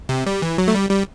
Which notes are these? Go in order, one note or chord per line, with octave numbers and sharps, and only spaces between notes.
C3
G3
E3
F#3
A3
G3
G3